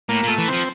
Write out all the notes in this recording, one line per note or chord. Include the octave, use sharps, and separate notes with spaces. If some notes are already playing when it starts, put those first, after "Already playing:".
A2 A#3
A#2 A3
E3
F3 C4